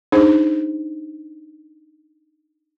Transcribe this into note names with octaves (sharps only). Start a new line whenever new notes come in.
D4 D#4 G#4 C5